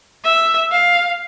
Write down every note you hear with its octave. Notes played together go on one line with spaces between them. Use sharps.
E5
F5